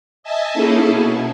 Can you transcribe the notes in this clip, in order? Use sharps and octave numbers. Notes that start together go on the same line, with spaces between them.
D#5 E5 G#5 A5
A#3 C#4 D#4 E4 G#4 A4
B2